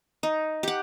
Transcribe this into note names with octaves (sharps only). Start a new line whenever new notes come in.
D#4
G4 F#5